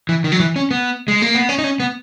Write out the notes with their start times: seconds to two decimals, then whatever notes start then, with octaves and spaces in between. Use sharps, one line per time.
0.09 E3
0.24 D#3
0.32 F#3
0.40 E3
0.56 C#4
0.71 B3
1.08 G#3
1.22 A#3
1.35 B3
1.49 C#4
1.58 D#4
1.64 C#4
1.80 B3